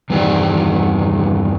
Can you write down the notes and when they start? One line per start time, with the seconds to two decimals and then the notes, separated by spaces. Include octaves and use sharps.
0.10 E2 G2 D#3 C4 G4 D5